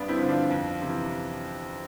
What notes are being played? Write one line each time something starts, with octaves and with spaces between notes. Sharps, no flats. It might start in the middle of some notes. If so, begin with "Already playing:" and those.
Already playing: G2 B3 D4
C4 E4
D3 F3
D4 F4
F2
C3 E3